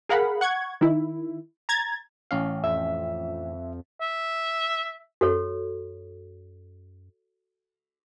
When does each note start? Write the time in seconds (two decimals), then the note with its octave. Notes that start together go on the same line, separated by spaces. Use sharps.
0.09 G#4 A#4 F5 F#5 B5
0.41 F#5 C#6 G#6
0.81 D#3 E4
1.69 A#5 G#6 A6
2.31 A1 C#4 F5
2.64 F2 E5
4.01 E5
5.21 F#2 F#4 A4 C#5